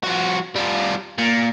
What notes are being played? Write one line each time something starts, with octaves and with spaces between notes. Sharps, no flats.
F3 F#4
G3 F4
A#2